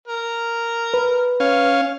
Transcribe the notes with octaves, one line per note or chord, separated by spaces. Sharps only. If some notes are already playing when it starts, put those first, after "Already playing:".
A#4
B4
C#4 F5